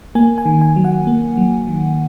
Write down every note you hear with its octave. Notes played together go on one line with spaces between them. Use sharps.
A#3 G#5
G#5
D#3
G#5
F#3
F#5
A#3
F#3
D#3